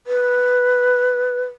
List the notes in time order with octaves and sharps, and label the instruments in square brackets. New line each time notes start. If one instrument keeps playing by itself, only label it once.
[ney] B4